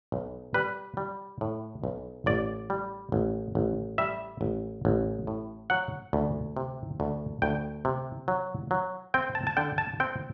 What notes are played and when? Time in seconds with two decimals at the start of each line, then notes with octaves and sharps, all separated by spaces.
0.12 B1
0.54 G3 B4
0.97 G3
1.41 A2
1.84 B1
2.26 A1 D5
2.70 G3
3.12 A1
3.55 A1
3.98 G3 E5
4.41 A1
4.85 A1
5.27 A2
5.70 F#3 F#5
6.13 D2
6.57 C3
7.00 D2
7.42 D2 G5
7.85 C3
8.28 F#3
8.71 F#3
9.14 C4 G5
9.35 A5
9.47 A5
9.57 D3 G5
9.78 A5
10.00 C4 G5